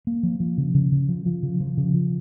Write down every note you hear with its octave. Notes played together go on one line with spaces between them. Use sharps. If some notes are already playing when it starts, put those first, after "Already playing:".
A#3
F3
F3
C#3
C#3
C#3
F3
F3
C#3
F3
C#3
F3